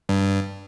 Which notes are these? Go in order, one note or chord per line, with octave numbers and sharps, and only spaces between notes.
G2